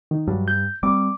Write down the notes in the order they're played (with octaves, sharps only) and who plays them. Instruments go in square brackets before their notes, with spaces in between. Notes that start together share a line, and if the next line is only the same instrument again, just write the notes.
[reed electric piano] D#3
[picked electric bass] G2 [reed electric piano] F#3
[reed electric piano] G6
[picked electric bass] G3 C4 [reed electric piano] D6